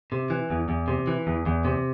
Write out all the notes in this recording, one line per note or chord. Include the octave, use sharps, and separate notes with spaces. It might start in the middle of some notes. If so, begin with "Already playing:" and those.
C3
E3
E2
E2
C3
E3
E2
E2
C3